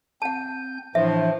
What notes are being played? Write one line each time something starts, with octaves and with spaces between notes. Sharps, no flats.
C4 F#5 A5 G6
A2 E3 F3 D4 E5